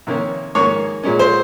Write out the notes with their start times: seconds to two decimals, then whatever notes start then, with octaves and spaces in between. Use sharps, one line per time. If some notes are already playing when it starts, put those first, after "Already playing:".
0.07 C3 D#3 A#3 C#4
0.55 G#2 D#3 A#3 C#4 C#5
1.03 A#2 G#3 C#4
1.19 C5